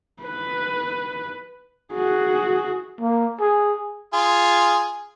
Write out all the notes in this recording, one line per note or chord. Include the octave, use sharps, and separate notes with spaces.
B4
F#4 G#4
A#3
G#4
F4 G#4